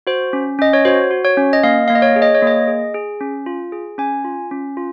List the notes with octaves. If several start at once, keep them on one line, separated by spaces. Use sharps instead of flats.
F#4 C5
C#4
C#4 D#5
C#5
F#4 C5
F#4
C#5
C#4
D#5
A#3 F5
A#3 F5
D#5
C#5
G#4
D#5
C#5
A#3 D#5
G#4
G#4
C#4
F4
G#4
C#4 G#5
F4
C#4
F4